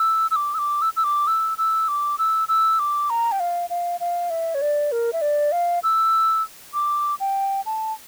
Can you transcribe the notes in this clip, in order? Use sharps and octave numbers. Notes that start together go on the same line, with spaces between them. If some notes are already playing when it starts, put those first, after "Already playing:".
Already playing: E6
E6
D6
E6
D6
E6
E6
D6
E6
E6
D6
E6
E6
D6
A#5
G5
F5
F5
F5
E5
C#5
D5
A#4
E5
D5
F5
E6
D6
G5
A5